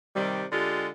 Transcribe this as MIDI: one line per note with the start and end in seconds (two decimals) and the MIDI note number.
0.15 0.45 48
0.15 0.45 51
0.15 0.45 55
0.52 0.88 50
0.52 0.88 56
0.52 0.88 65
0.52 0.88 67